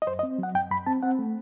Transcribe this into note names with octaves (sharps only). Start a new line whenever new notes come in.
D#5
F#2 C5
D#5
C4
F#3 F#5
F#2 G5
F#2 B5
C4 A5
C4 F#5
A3